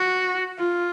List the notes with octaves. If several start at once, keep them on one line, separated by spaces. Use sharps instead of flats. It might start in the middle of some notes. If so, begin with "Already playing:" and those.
Already playing: F#4
F4